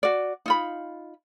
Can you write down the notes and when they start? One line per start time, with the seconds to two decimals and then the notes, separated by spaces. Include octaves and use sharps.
0.03 F#4 D5
0.46 D#4 F4 B5